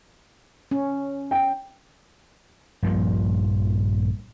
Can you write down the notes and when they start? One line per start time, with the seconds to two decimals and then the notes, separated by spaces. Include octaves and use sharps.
0.71 C#4
1.31 G5
2.82 A#1 G2 A#2 F3